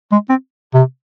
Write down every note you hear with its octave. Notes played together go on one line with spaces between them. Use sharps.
G#3
C4
C3